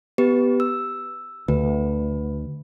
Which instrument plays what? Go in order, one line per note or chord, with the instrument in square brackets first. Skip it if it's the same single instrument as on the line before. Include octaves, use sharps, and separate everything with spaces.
[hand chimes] B3 G4 B4
E6
[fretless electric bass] D2 [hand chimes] B4